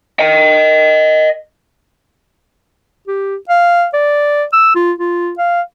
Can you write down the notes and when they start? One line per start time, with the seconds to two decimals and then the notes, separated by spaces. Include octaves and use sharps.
0.19 D#5 G5
3.08 G4
3.49 F5
3.94 D5
4.53 E6
4.75 F4
4.98 F4
5.38 F5